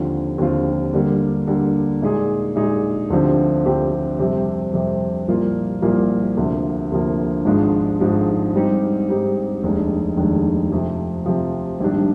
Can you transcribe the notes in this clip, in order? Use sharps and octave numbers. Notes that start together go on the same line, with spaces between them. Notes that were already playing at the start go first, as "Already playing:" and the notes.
Already playing: D#2 D3 F3 C4 F4
D#2 D3 F3 C4 F4
D3 G3 A#3
D3 G3 A#3
A#2 G#3 D#4 G#4
A#2 G#3 D#4 G#4
D2 D3 F3 C4 G4
D2 D3 F3 C4 G4
F2 C3 G3 C4
F2 C3 G3 C4
C2 A#2 F3 A#3 F4
C2 A#2 F3 A#3 F4
D2 C3 F3 A#3
D2 C3 F3 A#3
G#1 G#2 F3 G#3 D4
G#1 G#2 F3 G#3 D4
G#2 G3 C4 D#4 G4
G#2 G3 C4 D#4 G4
F1 D#2 D#3 G#3 D4
F1 D#2 D#3 G#3 D4
F2 C3 F3
F2 C3 F3
A#1 G#2 D#3 G3 D4